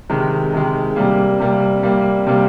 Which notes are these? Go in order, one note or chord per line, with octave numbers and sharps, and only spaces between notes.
C3 D#3 G#3
C3 D#3 G#3
C3 G3 A#3
C3 G3 A#3
C3 G3 A#3
C3 G3 A#3